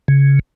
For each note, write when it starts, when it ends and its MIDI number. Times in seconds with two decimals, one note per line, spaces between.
0.08 0.39 49